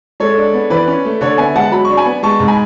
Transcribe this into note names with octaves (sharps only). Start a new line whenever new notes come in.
G#3 A4 C#5
D4
B3
E3 B4 D5
C#4
A3
D3 A4 C#5
B3 E5 G#5
G#3 F#5 A5
F#3 B5
D4 C#6
G#5 B5
B3
G#3 A5 C#6
G#2
G#5 B5